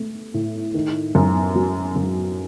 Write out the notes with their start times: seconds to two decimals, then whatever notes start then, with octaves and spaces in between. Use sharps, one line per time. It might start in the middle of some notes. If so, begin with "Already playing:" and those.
Already playing: A3
0.34 A2
0.74 D#3
1.15 F#2
1.55 F#3
1.96 F#2